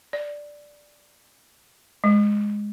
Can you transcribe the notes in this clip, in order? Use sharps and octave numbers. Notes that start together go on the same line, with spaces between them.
D5
G#3